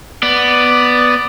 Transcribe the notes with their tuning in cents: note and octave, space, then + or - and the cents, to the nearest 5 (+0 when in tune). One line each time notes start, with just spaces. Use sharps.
B3 +0 D5 +0